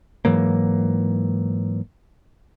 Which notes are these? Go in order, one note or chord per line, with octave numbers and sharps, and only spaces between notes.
G#2 E3 F#3 A#3